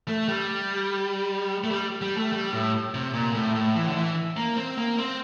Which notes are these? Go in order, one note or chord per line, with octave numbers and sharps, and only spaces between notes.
A3
G3
A3
G3
G3
A3
G3
A2
C3
A#2
A2
A2
E3
D3
E3
A#3
C4
A#3
C4